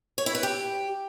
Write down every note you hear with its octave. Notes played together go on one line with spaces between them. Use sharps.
C#5
E4
B4
G4